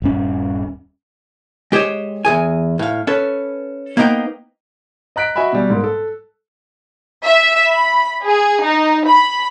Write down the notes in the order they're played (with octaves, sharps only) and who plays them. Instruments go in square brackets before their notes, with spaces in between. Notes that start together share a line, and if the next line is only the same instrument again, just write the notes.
[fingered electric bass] D#1 G2 C#4
[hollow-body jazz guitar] G#3 G4 C5 C#5 D#5
E2 C#3 G#4 G#5
A2 F5
C#4 A4 B4
A#3 B3 D#4 C5 G5
[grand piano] D#5 A#5 F#6 B6 D7
F#4 D#5 E5 G#5 B5
B2 G3
G#2 A#3
A4
[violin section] E5
B5
G#4
D#4
B5